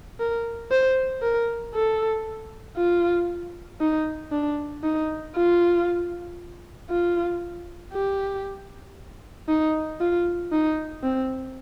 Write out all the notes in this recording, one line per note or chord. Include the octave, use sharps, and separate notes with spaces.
A#4
C5
A#4
A4
F4
D#4
D4
D#4
F4
F4
G4
D#4
F4
D#4
C4